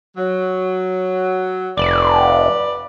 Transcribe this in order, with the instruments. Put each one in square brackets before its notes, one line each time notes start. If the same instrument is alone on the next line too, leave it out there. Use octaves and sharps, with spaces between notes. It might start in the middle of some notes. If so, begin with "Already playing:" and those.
[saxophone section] F#3
[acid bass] F1 [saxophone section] B4 D5